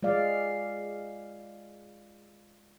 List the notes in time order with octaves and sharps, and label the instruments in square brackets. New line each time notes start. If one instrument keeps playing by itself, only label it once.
[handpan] G#3 F4 D5 F5